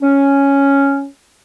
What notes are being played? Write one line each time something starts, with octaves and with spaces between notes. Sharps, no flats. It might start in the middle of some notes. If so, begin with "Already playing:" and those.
C#4